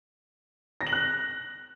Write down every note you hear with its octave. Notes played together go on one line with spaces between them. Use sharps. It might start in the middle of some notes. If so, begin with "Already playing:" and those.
A#6
F#7
F#6